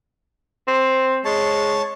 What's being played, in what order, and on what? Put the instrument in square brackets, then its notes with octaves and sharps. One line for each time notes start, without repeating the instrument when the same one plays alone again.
[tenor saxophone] C4
[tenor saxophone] G#3 [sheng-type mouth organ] C#5 A5